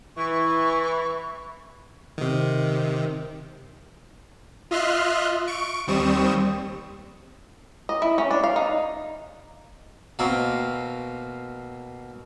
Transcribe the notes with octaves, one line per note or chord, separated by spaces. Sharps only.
E3 C#6
C3 D#3
F4 D#5 E5 C6 F6 F#6
C#6 D7
D#2 G3 C4 C#6 D#6 E7
D#5
E4
C#4
D4
F5
D#4
B2 A#3 C4 A#4